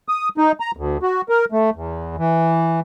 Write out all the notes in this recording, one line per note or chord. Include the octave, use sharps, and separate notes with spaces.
D#6
D#4
A#5
D2
F#4
A#4
A3
E2
E3